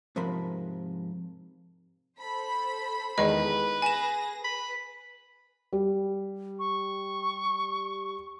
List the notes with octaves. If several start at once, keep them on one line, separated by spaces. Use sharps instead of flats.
G#2 C3 F3 A#4 B5 C6
A4 C5 B5
E2 D#3 G#3 B4 D#5
G#4 G#5 A#6 E7
B4 B5
G3
C#6